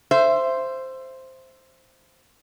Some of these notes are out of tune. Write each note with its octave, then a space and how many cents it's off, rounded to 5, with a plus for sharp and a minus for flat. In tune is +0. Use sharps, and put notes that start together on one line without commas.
C5 +0 E5 +25